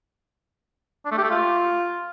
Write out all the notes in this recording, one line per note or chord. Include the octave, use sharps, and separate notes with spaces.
D4
A3
G4
A3
F4